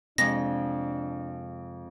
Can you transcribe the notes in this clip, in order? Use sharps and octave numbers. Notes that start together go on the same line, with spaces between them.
F2 C3 G#3 D4 A#6